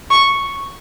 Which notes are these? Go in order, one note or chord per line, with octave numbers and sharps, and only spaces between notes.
C#6